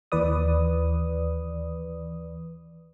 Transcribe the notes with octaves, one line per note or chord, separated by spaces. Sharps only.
D#2 E3 B4 D5 D#6